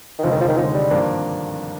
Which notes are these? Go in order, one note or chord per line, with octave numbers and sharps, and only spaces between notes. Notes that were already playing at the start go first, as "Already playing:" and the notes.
D#3
F1 D#2 D3 F3 G#3 D#4
D#3
F3
D#3
F1 D#2 D3 F3 G#3 D#4
G3
G#1 G2 F3 A#3 D4